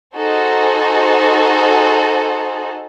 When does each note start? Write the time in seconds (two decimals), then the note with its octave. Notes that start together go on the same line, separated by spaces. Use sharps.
0.15 D#4 F#4 G#4 A4 C5